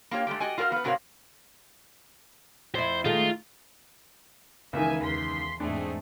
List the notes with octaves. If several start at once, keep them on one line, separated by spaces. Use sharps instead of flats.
A#3 F4 G4 C#5
G#3 A3 G4
F#4 G4 D#5 G#5
F4 F#4 A#4 D5 F5
B3 B4
G#2 C3 F#4 A#4 C#5 F5
F2 E4 C5
D#3 G#3 A3 F4
C#2 D#3 E3 A#3 E5 G#5
E2 C6 B6
E2 G#2 A3 C4 D4 G#4